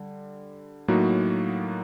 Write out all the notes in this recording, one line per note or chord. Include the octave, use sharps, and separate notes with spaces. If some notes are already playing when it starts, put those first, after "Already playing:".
Already playing: D3 G3
A2 F#3 A#3 D#4 F#4